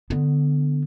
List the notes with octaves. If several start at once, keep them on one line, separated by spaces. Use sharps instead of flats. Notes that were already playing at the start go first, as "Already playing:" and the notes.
D3 B3